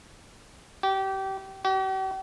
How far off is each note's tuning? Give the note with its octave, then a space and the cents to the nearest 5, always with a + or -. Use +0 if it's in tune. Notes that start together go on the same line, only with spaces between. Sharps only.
G4 -25
G4 -45